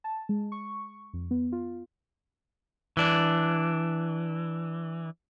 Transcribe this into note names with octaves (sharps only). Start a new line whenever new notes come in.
A5
G#3
C#6
F2
B3
F4
E3 D4